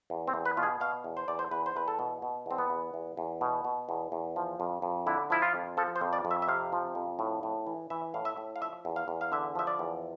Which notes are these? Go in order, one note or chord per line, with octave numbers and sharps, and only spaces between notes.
E2
C4
E2
B4
B2 F4
G#4
B2 F5
E2
C5
E2 D5
C5
E2 B4
C5
E2 B4
A4
B2
B2
E2 C4
B3
E2
E2
E2
B2
B2
E2
E2
F3
F2
F2
D3 E4
F3 E4
F4
F2
F3 A4
C5
F2
D5
F2
E5
E5
C3 F5
F3
F2
A2
A2
E3
E3 E5
A2 F5
E5
A2
F5
F3 E5
E2
F5
E2
F5
D3 E5
F3 E5
D5
E2